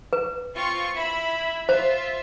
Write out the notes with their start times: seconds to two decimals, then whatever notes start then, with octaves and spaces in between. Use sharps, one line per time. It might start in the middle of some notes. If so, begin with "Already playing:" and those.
0.13 B4
0.54 C4 F4 C#6
0.95 E4 E5 B5
1.69 F4 C5 E5